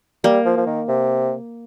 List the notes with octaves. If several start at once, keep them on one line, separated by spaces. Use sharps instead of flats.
G3 A#3
F3
F3
D#3
C3